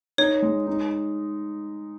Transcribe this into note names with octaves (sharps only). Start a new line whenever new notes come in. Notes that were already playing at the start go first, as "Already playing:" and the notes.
D#4 C#5
G#3
D#4